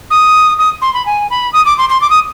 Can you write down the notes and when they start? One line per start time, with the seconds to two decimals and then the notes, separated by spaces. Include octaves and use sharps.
0.11 D#6
0.59 D#6
0.82 C6
0.94 B5
1.06 G#5
1.30 B5
1.53 D#6
1.66 D6
1.78 C6
1.89 C6
2.01 D6
2.10 D#6